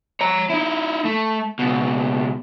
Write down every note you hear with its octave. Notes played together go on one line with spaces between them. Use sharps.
C#5 A#5
D#4 E4
A3
C#2 B2